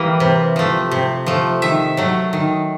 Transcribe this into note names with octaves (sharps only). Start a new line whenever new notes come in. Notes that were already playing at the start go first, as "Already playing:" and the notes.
Already playing: E3 G3 A#3
C3
F3 A3
C3
F3 A3
D#3 E5
F#3 A3
D#3